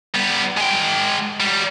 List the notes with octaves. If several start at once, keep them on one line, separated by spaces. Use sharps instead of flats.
G3 B3
G#3 G5
F#3 G3